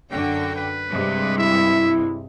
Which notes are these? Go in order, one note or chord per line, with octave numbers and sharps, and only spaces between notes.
F#2 D3 F#4 G5
B4
G2 C3 G#3
E4 E5